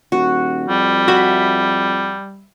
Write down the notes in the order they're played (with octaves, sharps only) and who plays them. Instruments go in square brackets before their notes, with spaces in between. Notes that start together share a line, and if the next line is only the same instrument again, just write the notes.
[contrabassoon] D#1 [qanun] F#4
[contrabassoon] F2 [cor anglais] G3
[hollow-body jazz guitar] F#4 [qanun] E5 B5